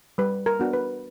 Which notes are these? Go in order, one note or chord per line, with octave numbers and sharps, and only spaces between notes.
G3 B4
A#4
B3 D4 F#4
B4